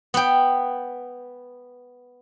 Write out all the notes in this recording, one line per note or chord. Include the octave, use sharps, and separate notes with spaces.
B3 G5